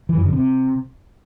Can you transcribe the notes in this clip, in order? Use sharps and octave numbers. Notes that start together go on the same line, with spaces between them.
E3
F#2
D3
C3